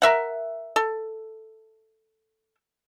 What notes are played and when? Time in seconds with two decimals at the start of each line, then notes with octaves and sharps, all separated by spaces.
0.02 A#4 E5 F#5
0.76 A4